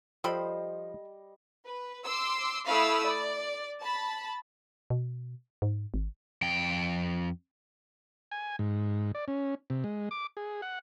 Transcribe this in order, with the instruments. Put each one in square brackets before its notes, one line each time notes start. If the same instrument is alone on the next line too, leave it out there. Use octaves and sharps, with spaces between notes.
[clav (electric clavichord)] F3 C5 [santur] G3 D#5 [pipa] A4 G5 B5
[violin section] B4
C6 D6 E6
A3 E4 F5 B5 D#6 E6
D5
A5 B5
[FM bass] B2
G#2
G#1
[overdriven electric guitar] F2 G5
[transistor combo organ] G#5
G#2
D5
C#4
C3
G#3
D6
G#4
F#5